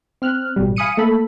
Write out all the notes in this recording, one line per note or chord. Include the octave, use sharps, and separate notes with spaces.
C4 F6 F#6
A1 B2 G3
F5 G#5 B5 D#6 C#7 D#7
A3 A#3 A4 B5